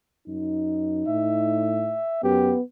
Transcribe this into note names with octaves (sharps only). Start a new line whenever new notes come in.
F#2 D#4
A2 E5
F#2 B3 G4